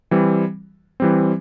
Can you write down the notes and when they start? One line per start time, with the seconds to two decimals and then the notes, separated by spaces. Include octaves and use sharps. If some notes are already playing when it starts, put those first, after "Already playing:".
0.11 E3 G3 C4
1.00 E3 G3 C4